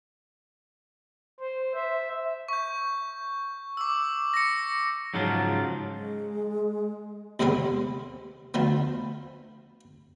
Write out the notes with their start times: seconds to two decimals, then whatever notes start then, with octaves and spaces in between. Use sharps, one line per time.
1.40 C5
1.74 E5
2.49 C#6 G6
3.77 D6 E6
4.34 A#6 C#7
5.14 G#2 C#3 F3 F#3 F4
5.94 G#3
7.40 D#2 G#2 C3 G#3 B3
8.54 D2 F3 B3